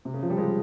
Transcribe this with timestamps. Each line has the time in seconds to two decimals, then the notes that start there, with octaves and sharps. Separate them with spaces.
0.05 C3
0.14 C#3
0.22 F3
0.30 G3
0.38 G#3